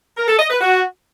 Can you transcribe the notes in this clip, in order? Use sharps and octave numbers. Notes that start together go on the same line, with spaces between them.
A#4
A4
D#5
B4
F#4